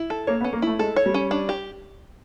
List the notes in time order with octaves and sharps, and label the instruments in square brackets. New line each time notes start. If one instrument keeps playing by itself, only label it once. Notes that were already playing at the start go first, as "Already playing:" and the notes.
Already playing: [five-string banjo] E4
A4
[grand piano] A#3 [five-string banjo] C#5
[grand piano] B3
[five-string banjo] C#4
[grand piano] A#3
[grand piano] A3 [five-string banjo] E4
[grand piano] G#3 [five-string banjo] A4
[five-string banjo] C#5
[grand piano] G3
[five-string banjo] C#4
D4
G4